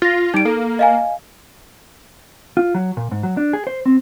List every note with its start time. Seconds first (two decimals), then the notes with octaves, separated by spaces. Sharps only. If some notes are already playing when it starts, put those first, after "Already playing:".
0.02 F4 A6 A#6
0.34 G3 D#4 D7
0.45 A#3 A4
0.79 D#5 F5 G#5
2.57 F4
2.75 F#3
2.97 A#2
3.11 G#2
3.23 F#3
3.37 D4
3.53 G#4
3.67 C5
3.86 C4